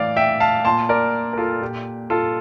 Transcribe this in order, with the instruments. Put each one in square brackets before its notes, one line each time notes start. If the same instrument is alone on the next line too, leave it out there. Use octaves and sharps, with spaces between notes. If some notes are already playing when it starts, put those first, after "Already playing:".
Already playing: [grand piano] A2 E3 D5 F5
E5 G5
F5 A5
A#2 A5 C6
A#4 D5
A#4
F4 A4
A#2 G4
F4 A4